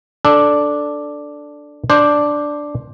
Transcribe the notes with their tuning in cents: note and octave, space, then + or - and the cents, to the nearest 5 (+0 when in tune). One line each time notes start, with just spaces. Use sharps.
D4 +0 A4 +0
D4 +0 C5 +10